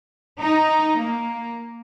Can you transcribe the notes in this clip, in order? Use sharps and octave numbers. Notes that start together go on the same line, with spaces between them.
D#4
A#3